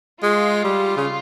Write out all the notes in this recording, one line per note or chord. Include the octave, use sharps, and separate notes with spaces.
G#3 F4
G3
C#3